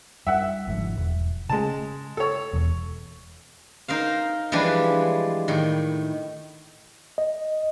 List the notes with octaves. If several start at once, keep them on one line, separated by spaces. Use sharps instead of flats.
G2 E5 F#5
G1 G#2 F3
E1
C#3 G#3 A5
A4 C#5
E1 E2
D#4 A#4 C5 F5
E3 F3 G3 G#3 D4 B4
A2 D#3
D#5